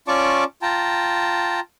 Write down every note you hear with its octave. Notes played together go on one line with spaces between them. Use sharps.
C#4 F4 D5 A5 C#6 D6
F4 G5 A5 A#5